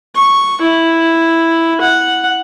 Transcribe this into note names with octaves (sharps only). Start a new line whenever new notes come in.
C#6
E4
F#5